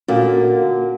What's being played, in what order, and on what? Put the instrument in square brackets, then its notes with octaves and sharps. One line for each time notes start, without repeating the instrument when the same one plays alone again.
[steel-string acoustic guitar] A#2 D3 A#3 [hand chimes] C#4 F#4 F#5